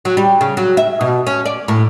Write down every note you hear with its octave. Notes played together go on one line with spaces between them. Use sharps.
F#3
G3
C#3
F#3
E5
B2
C#4
D5
A2